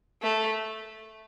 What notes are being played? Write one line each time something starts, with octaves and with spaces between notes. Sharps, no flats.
A3